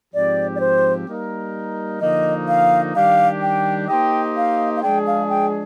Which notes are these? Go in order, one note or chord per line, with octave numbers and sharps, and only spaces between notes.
G#2 F3 C4 G4 D5
D5
C5
G3 A#3 D#4 A#4
D3 F3 A#3 D#4 D#5
F5
D#3 G3 D4 G4 F5
G5
A#3 D#4 G4 C5 D#5 G5
F5
F5
F3 G#3 D4 G#4 G5
F5
G5